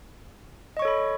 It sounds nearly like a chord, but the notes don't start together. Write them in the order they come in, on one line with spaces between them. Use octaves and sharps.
D#5 C#6 C#5 A4 B5